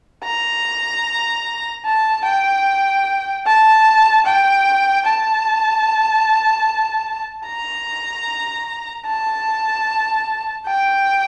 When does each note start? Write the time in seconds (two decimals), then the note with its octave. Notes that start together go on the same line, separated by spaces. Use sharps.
0.24 A#5
1.85 A5
2.25 G5
3.46 A5
4.26 G5
5.05 A5
7.46 A#5
9.07 A5
10.67 G5